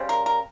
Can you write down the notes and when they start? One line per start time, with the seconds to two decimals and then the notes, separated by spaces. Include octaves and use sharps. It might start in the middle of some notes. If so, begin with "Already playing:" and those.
Already playing: C#3 G3 C4
0.09 A#4
0.26 A#4